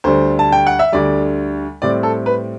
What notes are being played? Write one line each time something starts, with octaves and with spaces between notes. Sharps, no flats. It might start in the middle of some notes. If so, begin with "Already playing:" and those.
D2 D3 G3 C5
A5
G5
F#5
E5
D2 D3 G3 D5
A2 G3 C4 D5
A4
B4